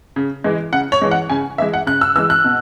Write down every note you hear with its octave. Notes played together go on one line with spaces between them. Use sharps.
C#3
E3 G#3
C#3 F#5
C#5
E3 G#3
F#5
C#3 G#5
E3 G#3 E5
F#5
C#3 F#6
E6
E3 G#3 E6
F#6
B2